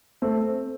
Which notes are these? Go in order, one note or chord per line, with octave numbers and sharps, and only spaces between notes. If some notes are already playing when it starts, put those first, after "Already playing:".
A3 C4